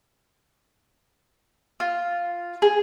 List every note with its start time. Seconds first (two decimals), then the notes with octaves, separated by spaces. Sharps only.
1.80 F4
2.62 G#4